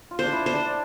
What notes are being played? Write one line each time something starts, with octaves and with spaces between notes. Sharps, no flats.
F4
D4 C5
E4
C5
D4